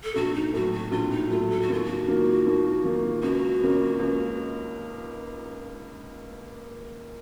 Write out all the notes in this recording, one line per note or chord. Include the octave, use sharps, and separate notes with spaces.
A4
A#1 F#4
D#4
A2 F#3 A3 F#4
F#4
A#1 F4
D#4
A2 F#3 A3 F4
A4
F#4
D#2 F4
F#4
D#3 A#3 F4
D#2
D#3 A#3 F4
C#2 F#4
C#3 F3 A#3 C#4
C#2